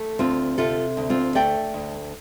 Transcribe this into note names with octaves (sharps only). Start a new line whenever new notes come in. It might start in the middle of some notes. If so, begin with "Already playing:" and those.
Already playing: A3
D2 C4 F4
C3 F4 A4
D2
C4 F4
A3 D5 G5
D2